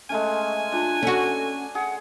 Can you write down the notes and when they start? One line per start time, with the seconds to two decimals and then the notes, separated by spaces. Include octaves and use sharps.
0.10 G#3 A3 C#4 G#5
0.72 D4 F4
1.03 C#4 F#4 A4
1.75 G#4 F#5